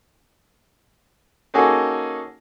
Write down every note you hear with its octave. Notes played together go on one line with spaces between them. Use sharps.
A#3 C#4 D#4 F#4 G#4 A4